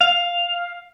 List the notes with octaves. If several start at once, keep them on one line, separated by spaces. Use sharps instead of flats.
F5